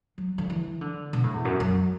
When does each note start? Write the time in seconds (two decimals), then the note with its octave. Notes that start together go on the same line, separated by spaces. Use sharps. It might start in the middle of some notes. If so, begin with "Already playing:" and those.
0.18 F#3
0.38 D3
0.50 E3
0.81 D3
1.13 B2
1.24 A2
1.34 E2
1.45 F#2
1.60 F#2